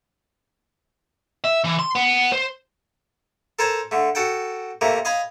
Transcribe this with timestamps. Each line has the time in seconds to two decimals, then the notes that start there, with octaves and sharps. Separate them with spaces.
1.45 E5
1.65 E3
1.79 C6
1.96 B3
2.32 C5
3.59 A4 A#4 C5 G#5 A5
3.91 D3 A3
4.15 F#4 A4 F#5 G5
4.81 C3 A3 A#3 A#4
5.05 D#5 F5 G#5 B5